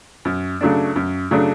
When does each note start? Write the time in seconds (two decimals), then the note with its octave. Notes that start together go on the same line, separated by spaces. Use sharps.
0.25 F#2
0.61 C#3 F#3 A3 D4
0.96 F#2
1.31 C#3 F#3 A3 D4